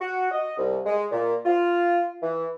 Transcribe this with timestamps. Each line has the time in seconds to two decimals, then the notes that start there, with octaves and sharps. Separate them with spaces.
0.01 F#4
0.32 D#5
0.58 C2
0.86 G#3
1.12 A#2
1.45 F4
2.23 E3